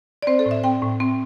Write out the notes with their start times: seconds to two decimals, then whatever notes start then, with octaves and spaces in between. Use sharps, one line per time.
0.22 D5
0.27 C4 C5
0.39 A4
0.46 A2
0.51 E5
0.64 C4 G5
0.82 A2
1.00 C4